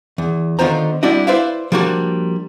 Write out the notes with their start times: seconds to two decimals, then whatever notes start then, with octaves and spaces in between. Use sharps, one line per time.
0.18 E2
0.59 D3 D#3 B3 F4 C5 A#5
1.03 G3 C4 D4 E4 F#4 D#5
1.27 E4 B4 C5 D5 E5 F5
1.72 F3 G3 A#3 D4 F#4